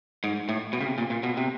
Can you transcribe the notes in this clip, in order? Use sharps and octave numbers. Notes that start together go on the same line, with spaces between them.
G#2
A2
B2
C#3
C3
A#2
A#2
B2
C3